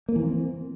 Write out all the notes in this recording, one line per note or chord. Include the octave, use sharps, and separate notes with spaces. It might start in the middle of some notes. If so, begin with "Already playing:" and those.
A#3
E3
C4